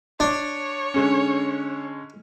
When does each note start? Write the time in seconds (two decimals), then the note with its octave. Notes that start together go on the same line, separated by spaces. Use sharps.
0.20 D4 C#5
0.94 D3 G#3 C#4